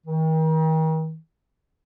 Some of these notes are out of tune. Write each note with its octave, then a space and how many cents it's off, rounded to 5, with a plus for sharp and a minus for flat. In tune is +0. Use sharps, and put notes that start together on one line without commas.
D#3 +40